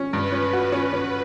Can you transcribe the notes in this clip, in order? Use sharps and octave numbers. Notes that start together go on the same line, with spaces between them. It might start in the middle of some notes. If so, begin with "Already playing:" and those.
Already playing: C#4
G2 B4
C#4
F#4
C#4
C#4